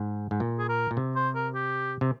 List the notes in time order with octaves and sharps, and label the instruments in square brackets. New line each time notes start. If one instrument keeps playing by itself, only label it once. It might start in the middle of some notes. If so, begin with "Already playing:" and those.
Already playing: [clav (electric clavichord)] G#2
G#2
A#2
[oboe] G#4
A#4
[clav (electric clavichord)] A#2
C3
[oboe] C5
A#4
G4
[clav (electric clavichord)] C3